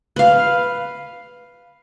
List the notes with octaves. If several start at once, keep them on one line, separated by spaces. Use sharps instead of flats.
B4 F5